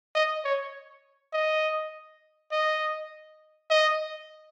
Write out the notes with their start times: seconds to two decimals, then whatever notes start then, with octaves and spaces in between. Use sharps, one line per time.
0.15 D#5
0.45 C#5
1.33 D#5
2.52 D#5
3.70 D#5